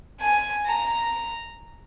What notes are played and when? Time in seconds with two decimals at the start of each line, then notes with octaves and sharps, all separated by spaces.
0.20 G#5
0.66 A#5